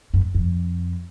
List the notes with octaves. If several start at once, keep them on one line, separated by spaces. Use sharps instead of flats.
F#2
F2